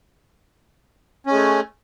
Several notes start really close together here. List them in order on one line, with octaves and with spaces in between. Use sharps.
C#4 G#3 A3